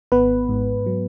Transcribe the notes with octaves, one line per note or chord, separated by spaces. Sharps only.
G#1 B3 B4
G#2
F#3